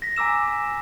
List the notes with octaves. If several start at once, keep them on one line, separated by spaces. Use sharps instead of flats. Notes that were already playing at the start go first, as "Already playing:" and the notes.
A#6 B6
G#5 A#5 D6 E6 E7